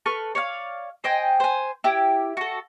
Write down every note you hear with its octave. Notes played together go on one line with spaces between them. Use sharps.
A4 B4 C#6 F6
C#5 D5 F5
C5 D#5 G5 G#5
C5 G#5
E4 G4
F#4 A4